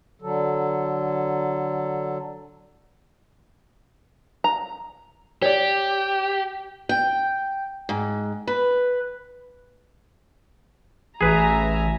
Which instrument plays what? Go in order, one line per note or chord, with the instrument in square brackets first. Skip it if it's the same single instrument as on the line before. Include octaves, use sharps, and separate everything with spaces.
[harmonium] D3 F#3 A4
[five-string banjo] A#5
[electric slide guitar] G4 [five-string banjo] C#5 D5
[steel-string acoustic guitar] G5
G#2
B4
[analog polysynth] A1 [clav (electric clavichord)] G#4 B4 [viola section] E5 G#5 A#5